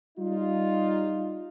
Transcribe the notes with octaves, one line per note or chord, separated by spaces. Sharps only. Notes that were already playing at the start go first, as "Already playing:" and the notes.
G3 D#4 F4